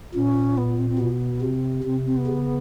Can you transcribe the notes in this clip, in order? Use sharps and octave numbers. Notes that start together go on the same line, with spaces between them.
A#2 C#4
B3
C4
C4
B2 B3
C3 C4
C3 C4
C4
B3
C#3